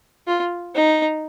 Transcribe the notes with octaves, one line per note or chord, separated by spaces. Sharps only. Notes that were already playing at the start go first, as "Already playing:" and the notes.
F4
D#4